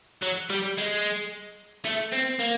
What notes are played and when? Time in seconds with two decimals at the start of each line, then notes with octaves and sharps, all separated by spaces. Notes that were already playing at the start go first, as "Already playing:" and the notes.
0.23 F#3
0.50 G3
0.78 G#3
1.85 A3
2.13 C4
2.40 A#3